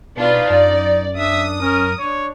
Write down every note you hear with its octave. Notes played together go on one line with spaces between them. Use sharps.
B2 D4 D#4 F4 B4
F#2 D5
D4 E5 D#6
C#4 A#4
D4 C#5